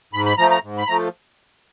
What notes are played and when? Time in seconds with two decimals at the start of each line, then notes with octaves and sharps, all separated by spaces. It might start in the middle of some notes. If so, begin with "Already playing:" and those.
0.13 G#2 B5
0.26 B5
0.38 F3 A3 A#5
0.51 A#5
0.63 G#2
0.78 B5
0.88 F3 A3 A#5